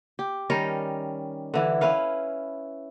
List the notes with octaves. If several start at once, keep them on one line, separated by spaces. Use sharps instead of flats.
G4
D#3 G3 C#4 A#4
D3 E3 E4
C#4 E4 B4 F5